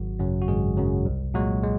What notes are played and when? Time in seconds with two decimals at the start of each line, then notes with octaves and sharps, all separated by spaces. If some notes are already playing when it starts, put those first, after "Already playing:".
Already playing: G#1 F#3 F#4
0.19 F#2 C#3 F#3
0.41 F#4
0.48 G#1 G#3 G#4
0.77 F#2 C#3 F#3
1.06 C2
1.34 A#2 F#3 G#3 F#4
1.63 G#3